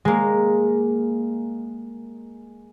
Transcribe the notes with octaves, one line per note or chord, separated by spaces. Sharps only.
G#3 A#3